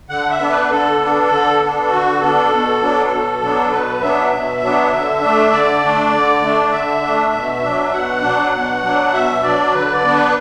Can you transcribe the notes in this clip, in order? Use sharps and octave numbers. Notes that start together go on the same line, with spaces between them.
D3 F#5
E5
B3 D4
B4
D3 A4
B3 D4
D3
B3 D4
D3 F#4
B3 D4 A4
B2
F#3 B3 D4
B2
F#3 B3 D4
B2 B4
F#3 B3 D4 E5
B2
F#3 B3 D4
D3
A3 D4
D3 D5
A3 D4
D3
A3 D4
D3 E5
A3 D4
B2
F#3 D4
B2 F#5
F#3 D4
B2
F#3 D4
B2 E5
F#3 D4 D5
D3 B4
D5
B3 D4
B4